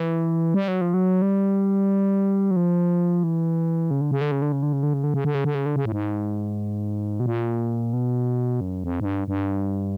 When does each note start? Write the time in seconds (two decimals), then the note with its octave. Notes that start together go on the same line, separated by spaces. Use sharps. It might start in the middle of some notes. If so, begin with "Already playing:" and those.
Already playing: E3
0.54 G3
0.68 F#3
0.81 F3
0.94 F#3
1.22 G3
2.51 F#3
2.56 F3
3.23 E3
3.91 C#3
4.01 D3
4.11 C#3
4.21 D3
4.32 C#3
4.42 D3
4.52 C#3
4.63 D3
4.73 C#3
4.83 D3
4.93 C#3
5.04 D3
5.14 C#3
5.25 D3
5.35 C#3
5.45 D3
5.55 C#3
5.66 D3
5.76 C#3
5.85 A2
5.92 G#2
7.20 B2
7.26 A#2
7.93 B2
8.61 F#2
8.84 F2
9.00 G#2
9.05 G2
9.28 G2